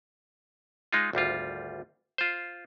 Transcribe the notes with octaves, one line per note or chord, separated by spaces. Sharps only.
G#3 D#4 F4
G#1 D2 G3 F4
F4 C5